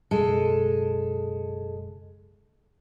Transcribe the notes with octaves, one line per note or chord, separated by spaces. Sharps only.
F#1 B1 G#3 A4